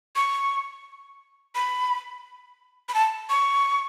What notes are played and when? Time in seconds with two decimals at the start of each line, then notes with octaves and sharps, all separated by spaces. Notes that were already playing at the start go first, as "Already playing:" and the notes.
0.16 C#6
1.55 B5
2.89 B5
2.94 A5
3.29 C#6